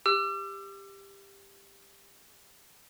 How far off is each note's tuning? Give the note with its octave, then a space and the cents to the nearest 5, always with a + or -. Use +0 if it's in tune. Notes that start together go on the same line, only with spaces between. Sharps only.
G4 +15 E6 +40